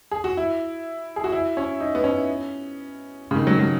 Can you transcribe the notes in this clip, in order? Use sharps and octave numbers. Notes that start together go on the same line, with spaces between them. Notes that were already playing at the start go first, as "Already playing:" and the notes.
G#4
F#4
E4
G#4
F#4
E4
C#4
D#4
B3
C#4
C#3
D#3
F#3
F#3